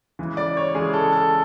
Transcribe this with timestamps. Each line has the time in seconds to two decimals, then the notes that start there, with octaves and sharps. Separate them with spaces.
0.19 C#3 E3 G#3
0.37 D5
0.57 C#5
0.75 C#3 E3 G#3 G#4
0.93 A4
1.13 A4